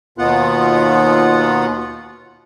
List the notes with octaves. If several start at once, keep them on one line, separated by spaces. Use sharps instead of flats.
D#2 B2 B3 F4 F#5